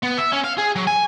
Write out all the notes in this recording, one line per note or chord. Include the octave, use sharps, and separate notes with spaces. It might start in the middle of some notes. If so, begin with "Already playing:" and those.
B3
E5
C#4
F5
G#4
F#3
G#5